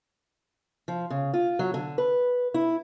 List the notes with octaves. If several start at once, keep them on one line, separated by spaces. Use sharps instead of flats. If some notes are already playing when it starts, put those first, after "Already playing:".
F3
C#3
F4
F#3
D3
B4
E4